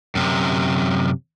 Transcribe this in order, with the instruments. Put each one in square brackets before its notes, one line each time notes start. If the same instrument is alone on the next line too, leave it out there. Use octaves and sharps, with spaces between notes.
[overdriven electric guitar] F#2 C3